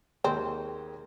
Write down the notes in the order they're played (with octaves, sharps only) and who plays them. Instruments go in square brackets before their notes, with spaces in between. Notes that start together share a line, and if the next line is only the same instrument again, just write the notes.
[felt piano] D#2 G#3 A#3 [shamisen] C4